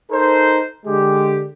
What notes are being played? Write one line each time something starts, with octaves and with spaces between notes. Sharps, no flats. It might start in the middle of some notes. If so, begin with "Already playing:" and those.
D#4 A4 A#4 C5
D3 G#3 G4